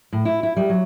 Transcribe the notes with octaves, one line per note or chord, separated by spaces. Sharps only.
A2
E4
E4
G3
F#3